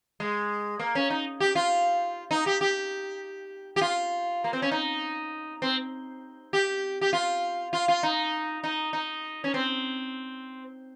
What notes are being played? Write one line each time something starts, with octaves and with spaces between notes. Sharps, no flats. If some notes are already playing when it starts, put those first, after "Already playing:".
G#3
A#3
C#4
D#4
G4
F4
D#4
G4
G4
G4
F4
A#3
C4
C#4
D#4
C4
G4
G4
F4
F4
F4
D#4
D#4
D#4
C#4
C4